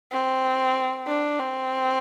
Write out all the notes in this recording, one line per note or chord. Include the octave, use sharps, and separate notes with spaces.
C4
D4
C4